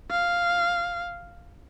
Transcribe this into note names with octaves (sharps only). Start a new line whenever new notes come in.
F5